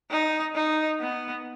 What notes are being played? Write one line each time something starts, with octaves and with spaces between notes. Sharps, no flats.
D#4
D#4
B3